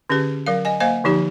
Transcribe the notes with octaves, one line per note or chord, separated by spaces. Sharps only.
D3 C#4 G4 G#4 B4
F#3 A#4 F5
D#5 G#5
A#3 C5 D#5 F5 G#5
D3 F3 D#4 G4 B5